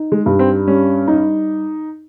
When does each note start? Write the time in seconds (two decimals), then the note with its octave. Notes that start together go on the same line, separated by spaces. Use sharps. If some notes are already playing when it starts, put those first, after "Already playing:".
Already playing: D#4
0.12 G#3
0.26 G2
0.39 C4
0.67 G3 C#4
1.08 D#4